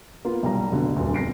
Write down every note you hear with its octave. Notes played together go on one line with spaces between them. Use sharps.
A#3 B3 F4
B1 G3 A#5
F1 B2 D3
D#1 D2
F2 A#6 C7 D7